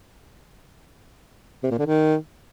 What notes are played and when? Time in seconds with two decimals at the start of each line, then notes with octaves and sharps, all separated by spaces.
1.63 C3
1.71 A#2
1.78 D3
1.86 D#3